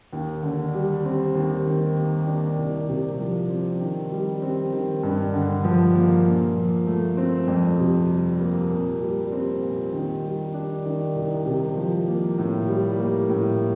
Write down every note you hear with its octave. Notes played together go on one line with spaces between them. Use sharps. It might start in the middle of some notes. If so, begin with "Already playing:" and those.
D#2
D3
G3
C4
D#2
D#3
A#3
D4
C2
C3
F3
C4
D#3
G3
C4
D#3
G2
D3
F3
A#3
A#2
F3
A3
C4
F2
C3
G3
A#3
A#2
G3
C4
A#2
D#3
G3
D4
D#3
C2
C3
F3
A#3
A2
G3
A#3
A2